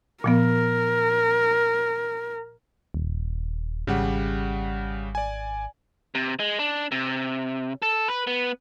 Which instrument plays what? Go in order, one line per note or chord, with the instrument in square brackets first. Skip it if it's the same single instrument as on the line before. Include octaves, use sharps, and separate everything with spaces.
[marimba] A#2 F3 B3 [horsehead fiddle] A#4
[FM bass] D#1
[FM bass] G#1 [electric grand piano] C#3 G3 F#5
[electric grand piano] D5 G#5
[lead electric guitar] C3
G#3
D4
C3
A4
B4
B3